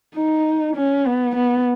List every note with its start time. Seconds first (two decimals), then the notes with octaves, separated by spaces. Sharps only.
0.16 D#4
0.76 C#4
1.07 B3
1.36 B3